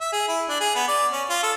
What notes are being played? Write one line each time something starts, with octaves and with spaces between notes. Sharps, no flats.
E5
G#4
E4
D4
G#4
B3
D5
C#4
F4
A4